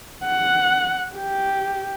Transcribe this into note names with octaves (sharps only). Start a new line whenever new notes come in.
F#5
G4